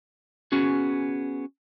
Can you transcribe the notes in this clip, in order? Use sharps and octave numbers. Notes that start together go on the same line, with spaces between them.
B3 C#4 F#4 G#4